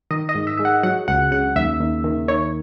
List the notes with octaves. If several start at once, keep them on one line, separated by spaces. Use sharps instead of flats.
D#3 D#5
D#5
G#2
E5
G#3 E5
F#5
F#3 F#5
C#2 F#5
C#3 F#5
D#2 E5
D#2
D#3
D#3 C#5